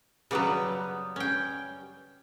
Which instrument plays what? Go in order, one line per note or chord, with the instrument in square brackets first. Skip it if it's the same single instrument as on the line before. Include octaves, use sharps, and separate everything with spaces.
[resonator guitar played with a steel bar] F#2 G3 B3 [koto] C#3 F#3
[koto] C#4 G5